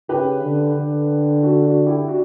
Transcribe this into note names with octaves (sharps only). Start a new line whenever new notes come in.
C#3 G4 B4
D3
D3
F#4 A4
D4 F#4
E4 G4
D4 F#4